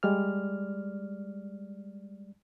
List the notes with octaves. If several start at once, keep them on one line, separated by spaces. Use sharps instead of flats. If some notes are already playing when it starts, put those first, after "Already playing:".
G3 G#3 D5 F6